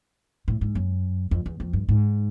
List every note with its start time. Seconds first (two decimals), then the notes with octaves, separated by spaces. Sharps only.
0.48 A2
0.61 G#2
0.75 F#2
1.31 F2
1.46 E2
1.60 F2
1.73 G2
1.89 G#2